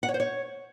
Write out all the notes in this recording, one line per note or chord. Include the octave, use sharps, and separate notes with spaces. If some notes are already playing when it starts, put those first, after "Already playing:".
F#5
C#5
C5
C#5